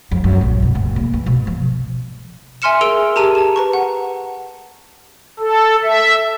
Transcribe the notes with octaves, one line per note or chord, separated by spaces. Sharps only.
F2
F#2
A#1
B2
F#1
A#3
E3
B2
F3
E5 G#5 C6 F6 C#7 E7
G#4 A#4 E6 D7 F7 G7
G4 G#4 A5 A#5 D#7 F7
A5 E7
B4 A#5 C#6
F#5
A4
E5